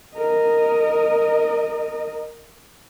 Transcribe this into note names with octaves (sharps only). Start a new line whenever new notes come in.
A#4 D#5